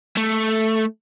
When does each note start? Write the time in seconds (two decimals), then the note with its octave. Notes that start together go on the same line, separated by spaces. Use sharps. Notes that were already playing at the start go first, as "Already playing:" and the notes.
0.17 A3